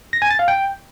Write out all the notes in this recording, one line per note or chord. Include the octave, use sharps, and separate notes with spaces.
A#6
G#5
A6
F5
G5